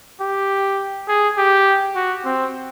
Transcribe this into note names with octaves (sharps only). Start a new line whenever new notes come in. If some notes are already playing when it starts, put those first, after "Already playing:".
G4
G#4
G4
F#4
C4